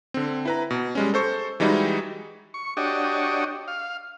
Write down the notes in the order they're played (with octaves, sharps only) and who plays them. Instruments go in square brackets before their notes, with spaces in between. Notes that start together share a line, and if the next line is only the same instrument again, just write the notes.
[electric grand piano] D3 C4
E4 B4 A#5
B2
G3 G#3 C#4
A4 C5 C#6
E3 G3 G#3 D#4 E4 F#4
[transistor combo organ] C#6
D4 F#4 G4 C#5 D#5
F5